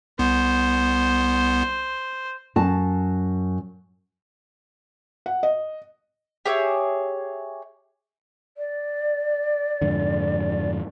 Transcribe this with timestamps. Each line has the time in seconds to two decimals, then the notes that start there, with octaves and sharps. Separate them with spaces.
0.19 C2 B3 C5
2.56 F#2 A5
5.26 F#5
5.43 D#5
6.46 G4 G#4 C#5 E5
8.57 D5
9.82 F2 G#2 D3